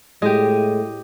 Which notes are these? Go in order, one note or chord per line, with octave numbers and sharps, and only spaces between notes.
A2 G#3 G4 D#5